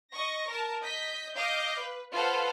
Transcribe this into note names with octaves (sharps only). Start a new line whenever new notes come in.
D#5 C#6 A#6
A#4 A5
D#5 G6 B6
D#5 F5 D6 G6
B4
F4 A4 B4 C5 F5 F#5